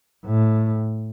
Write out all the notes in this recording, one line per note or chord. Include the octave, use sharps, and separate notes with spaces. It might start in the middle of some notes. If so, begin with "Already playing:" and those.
A2